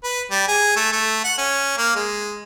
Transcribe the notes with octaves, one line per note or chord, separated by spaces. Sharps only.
B4
G3
G#4
A3
A3
F#5
C#4
A#3
G#3